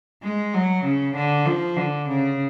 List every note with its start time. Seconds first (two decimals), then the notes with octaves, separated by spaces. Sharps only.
0.23 G#3
0.54 F#3
0.85 C#3
1.15 D3
1.46 F3
1.77 D3
2.08 C#3